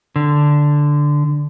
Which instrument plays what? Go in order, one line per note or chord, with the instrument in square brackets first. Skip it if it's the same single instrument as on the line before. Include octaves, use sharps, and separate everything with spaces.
[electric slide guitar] D3